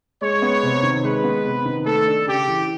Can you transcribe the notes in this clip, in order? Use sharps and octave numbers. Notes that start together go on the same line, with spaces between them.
G#3 C#5
B3
C3
D#3
G#3 B4
B3
C3
D#3
A3 A4
D4
C#3 G4
E3